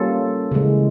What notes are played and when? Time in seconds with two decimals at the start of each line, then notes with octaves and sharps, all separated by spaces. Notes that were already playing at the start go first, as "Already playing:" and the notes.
Already playing: G3 A#3 C#4 F4 A4
0.52 C#3 E3 G#3